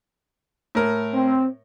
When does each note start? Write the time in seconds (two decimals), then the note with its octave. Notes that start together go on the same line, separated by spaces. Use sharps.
0.75 A2 A#4
1.14 C4